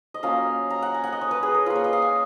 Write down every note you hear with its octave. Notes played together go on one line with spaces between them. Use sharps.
D#5
F#3 A#3 C#4 F4 F5
A#5
F#5
G#5
F#5
D#5
C#5
B4
G#4
A#4
A#3 F4 B4
C#5
D#5
F5
G#5